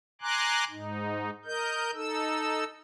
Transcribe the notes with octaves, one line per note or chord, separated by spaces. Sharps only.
G#5 A#5 C6 D6 F#6
G#2 D#4
A#4 D#5 G6
D#4 A4 E6